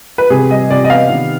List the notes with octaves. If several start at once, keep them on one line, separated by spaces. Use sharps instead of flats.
B4
C3 G#4
G3 D#5
C3 D5
D#5
B3 F5
D#3